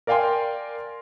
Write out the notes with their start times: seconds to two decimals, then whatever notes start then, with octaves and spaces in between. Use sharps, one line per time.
0.07 A#4 D5 F5 G5 G#5 C6